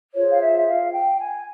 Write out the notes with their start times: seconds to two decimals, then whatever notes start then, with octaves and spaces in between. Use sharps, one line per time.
0.14 F4 G#4 C5 C#5
0.30 F5
0.41 E5
0.57 E5
0.67 F5
0.92 G5
1.19 G#5